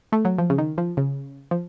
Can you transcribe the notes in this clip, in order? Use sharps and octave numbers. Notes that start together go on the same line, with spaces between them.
A3
F#3
F3
C#3
D#3
F3
C#3
F3